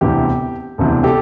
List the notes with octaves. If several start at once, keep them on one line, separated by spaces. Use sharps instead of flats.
E1 D2 C3 E3 G4
E1 D2 C3 E3
G4 A4